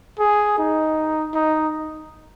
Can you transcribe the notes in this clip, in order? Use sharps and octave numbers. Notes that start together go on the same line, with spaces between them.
G#4
D#4
D#4